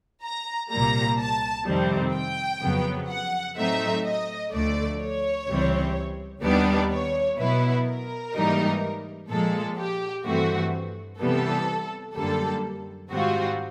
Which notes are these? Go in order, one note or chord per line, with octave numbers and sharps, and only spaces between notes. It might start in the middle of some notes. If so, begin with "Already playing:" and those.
A#5
C2 A#2 G3 A#3 A#5
A5
F2 C3 D#3 G3 C4
G5
F2 C#3 F#3 B3
F#5
A2 F#3 A3 C4 D#4 E5
D#5
D2 D3 F3 A3 D5
C#5
C#2 C3 E3 G3 C4
D#2 D#3 G3 B3 D4 D5
C#5
B2 F#3 B3 E4 B4
A#4
G#2 E3 G3 A#3 D#4
A#2 F3 G#3 A4
G4
G2 E3 A3 C4 F#4
C3 E3 G3 B3 A4
F#2 D3 G3 A#3 A4
G#2 D#3 G3 C4 F4 F#4